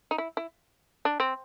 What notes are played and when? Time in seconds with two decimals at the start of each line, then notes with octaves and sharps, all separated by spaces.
0.11 D#4
0.18 E4
0.37 E4
1.05 D4
1.20 C4